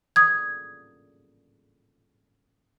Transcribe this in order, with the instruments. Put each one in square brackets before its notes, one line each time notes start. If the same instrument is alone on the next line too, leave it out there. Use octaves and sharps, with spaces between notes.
[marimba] D#6 G#6